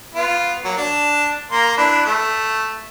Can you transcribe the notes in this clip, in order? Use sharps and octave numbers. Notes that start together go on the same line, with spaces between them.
B3 F4
F#3 A#3
D4 A5
A#3 A#5 C6
D4 E4 B4
A3